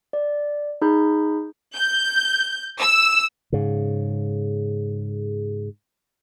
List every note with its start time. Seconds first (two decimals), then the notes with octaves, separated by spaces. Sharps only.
0.13 D5
0.82 D#4 G#4 B5 G6
1.76 G6
2.80 E6
3.53 G#2 C#3